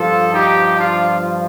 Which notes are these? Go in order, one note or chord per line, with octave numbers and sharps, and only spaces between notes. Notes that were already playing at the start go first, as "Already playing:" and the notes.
Already playing: G2 F3 F4 A4
D#4 G4
D4 F4